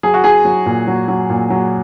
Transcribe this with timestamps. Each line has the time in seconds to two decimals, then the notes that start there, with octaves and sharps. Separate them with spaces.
0.03 F#3 G#4
0.14 F#4
0.24 F#3 G#4
0.45 F#3
0.66 A#2
0.87 F#3
1.08 F#3
1.30 A#2
1.50 F#3